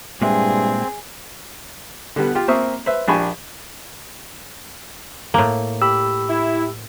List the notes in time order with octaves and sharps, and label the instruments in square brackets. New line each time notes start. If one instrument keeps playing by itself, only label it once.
[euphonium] G2 [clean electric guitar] A#2 G#3 E5 [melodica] C4 [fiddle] G#4
[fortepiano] D3 G3 B3
F4 G4
A#3 C4 C5 E5 C#6 D#6
B4 C5 E5
A#1 D4 G4 G#5 B5 C#6
[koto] A2 A#3
[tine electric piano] G4 B5 [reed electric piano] E6
[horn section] E4